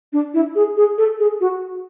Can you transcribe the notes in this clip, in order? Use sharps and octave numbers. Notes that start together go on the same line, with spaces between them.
D4
E4
G#4
G#4
A4
G#4
F#4